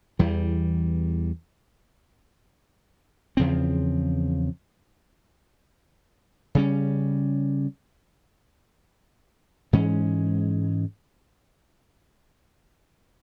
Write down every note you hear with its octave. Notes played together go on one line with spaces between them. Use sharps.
E2 E3 G3
E2 C#3 F3 C4
C#3 G3 C#4
G#2 E3 G#3 C#4